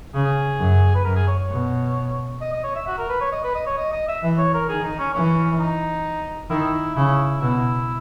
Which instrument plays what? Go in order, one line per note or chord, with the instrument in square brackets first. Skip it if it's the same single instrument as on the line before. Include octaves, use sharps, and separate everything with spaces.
[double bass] C#3 [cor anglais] G#4
[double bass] F#2
[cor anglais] B4
[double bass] F#2 [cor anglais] A#4
[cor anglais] G#4
C#5
C#5
[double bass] B2
[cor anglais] D#5
D#5
C#5
E5
F#4
A#4
B4
C#5
D#5
B4
D#5
C#5
D#5
D#5
E5
[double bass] E3
[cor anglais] C#5
A#4
[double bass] D#3 [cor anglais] G#4
[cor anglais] D#4
C#4
[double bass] E3 [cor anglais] C#4
[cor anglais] D#4
[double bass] D#3 [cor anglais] E4
[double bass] C#3 [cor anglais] E4
[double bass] B2 [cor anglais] E4